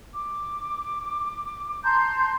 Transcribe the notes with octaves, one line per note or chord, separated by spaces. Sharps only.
D6
A5 A#5 C6 G6